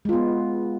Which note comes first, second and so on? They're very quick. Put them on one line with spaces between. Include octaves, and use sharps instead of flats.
G#3 F4 B3